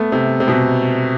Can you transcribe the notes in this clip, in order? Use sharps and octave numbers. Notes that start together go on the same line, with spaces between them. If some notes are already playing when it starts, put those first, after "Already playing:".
Already playing: A3 B3
C3
C3
B2